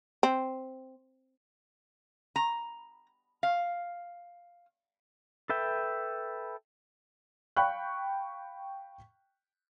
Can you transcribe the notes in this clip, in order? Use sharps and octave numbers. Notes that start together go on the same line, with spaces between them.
C4
A#5
F5
A4 B4 E5 G5
F5 G5 B5 C#6 F#6